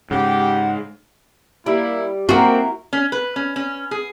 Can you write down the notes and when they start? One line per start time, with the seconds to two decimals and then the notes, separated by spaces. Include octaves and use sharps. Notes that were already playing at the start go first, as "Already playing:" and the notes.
0.11 G#2 C#3 G4 F#5
1.66 G3 A#3 E4
2.29 A#3 C4 E4 F#4 G#4 A#4
2.93 C#4
3.12 B4
3.36 C#4
3.56 C#4
3.91 G#4